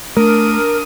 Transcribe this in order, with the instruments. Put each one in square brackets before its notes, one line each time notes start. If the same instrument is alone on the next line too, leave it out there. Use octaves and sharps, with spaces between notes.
[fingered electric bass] A3 [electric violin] D4 D#6 [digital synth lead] A#4